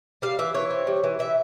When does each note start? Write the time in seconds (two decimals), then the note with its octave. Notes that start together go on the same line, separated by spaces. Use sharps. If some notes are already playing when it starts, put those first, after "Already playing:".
0.22 G3 F5
0.39 E3 E5
0.55 E3 C#5
0.70 C4
0.87 G3
1.04 E3
1.19 E3 E5